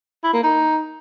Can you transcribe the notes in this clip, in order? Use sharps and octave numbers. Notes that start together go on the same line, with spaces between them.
E4
A#3
D#4